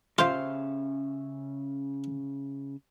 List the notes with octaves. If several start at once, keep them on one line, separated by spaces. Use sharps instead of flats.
C#3 C#4 F4 G4 C5 E5 F5